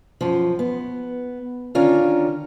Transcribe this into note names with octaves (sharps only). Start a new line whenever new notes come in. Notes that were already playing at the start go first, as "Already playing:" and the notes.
F#2 F3
B3
D3 D#3 C#4 D4 F4 A#4